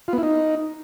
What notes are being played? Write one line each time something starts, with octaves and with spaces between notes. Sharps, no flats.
F4
B3
E4
D#4